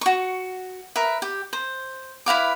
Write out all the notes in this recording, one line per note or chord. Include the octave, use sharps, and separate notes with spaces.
F#4 C#6
A#4 B4 E5
G4
C5
E4 B4 F5 D6